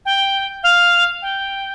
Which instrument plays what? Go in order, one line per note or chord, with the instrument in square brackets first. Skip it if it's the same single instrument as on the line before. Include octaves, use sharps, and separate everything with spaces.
[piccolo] G5
F5
G5